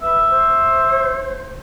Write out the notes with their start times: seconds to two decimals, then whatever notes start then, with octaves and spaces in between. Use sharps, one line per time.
0.02 B4 E5
0.30 C5